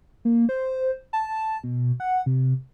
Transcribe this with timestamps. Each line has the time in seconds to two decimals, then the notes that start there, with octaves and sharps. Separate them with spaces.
0.25 A#3
0.49 C5
1.13 A5
1.64 B2
2.00 F#5
2.26 C3